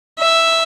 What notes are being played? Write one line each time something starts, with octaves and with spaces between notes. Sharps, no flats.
E5